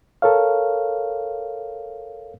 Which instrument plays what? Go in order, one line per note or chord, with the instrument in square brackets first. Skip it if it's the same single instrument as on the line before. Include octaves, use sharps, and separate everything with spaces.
[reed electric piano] A4 A#4 C#5 F5